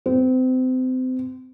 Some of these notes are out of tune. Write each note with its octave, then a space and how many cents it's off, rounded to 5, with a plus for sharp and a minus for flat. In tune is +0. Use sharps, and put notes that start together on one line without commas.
C4 -30